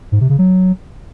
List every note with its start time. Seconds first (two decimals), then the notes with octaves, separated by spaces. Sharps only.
0.12 G#2
0.21 C3
0.30 C#3
0.39 F#3